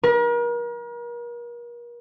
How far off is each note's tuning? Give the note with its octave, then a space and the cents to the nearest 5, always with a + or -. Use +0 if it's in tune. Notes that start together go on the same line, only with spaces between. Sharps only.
A#4 +40